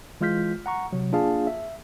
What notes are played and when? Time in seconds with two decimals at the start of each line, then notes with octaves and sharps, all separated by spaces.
0.21 E3 G#3 F4 F6 G6 B6
0.66 F#5 A#5 C#6
0.93 C3 F#3
1.12 A#3 D4 F4 G#4 F5 A5
1.47 E5